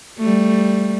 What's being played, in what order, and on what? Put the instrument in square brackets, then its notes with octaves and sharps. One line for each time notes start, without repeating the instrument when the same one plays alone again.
[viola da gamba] G3 A3